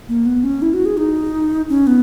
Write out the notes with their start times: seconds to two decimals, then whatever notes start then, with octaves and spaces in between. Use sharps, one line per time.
0.09 A#3
0.26 B3
0.44 C#4
0.62 E4
0.74 F#4
0.86 G#4
0.97 D#4
1.69 C#4
1.87 B3